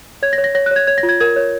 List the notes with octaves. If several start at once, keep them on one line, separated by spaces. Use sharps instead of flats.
C#5 G#6
A#6
C#5
A#6
C#5 A#6
F#6
C#5 G#6
C#5 G#6
A#6
F4
G#6
A#4 G#6
C#5